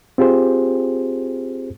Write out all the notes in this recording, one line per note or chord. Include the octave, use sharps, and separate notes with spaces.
C4 F4 G4 G#4 C5